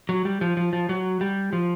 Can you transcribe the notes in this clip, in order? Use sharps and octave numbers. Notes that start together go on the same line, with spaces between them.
F#3
G3
F3
F3
F3
F#3
G3
F3